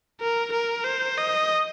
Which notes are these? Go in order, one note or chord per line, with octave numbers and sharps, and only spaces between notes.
A#4
A#4
C5
D#5